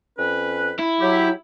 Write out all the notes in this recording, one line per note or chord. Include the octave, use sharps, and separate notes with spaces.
F2 C#4 B4
E4
F#3 G4